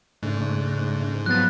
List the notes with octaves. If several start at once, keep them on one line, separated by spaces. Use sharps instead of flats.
G#2 C#3 A3 D4
F3 F#3 B3 F#6 A6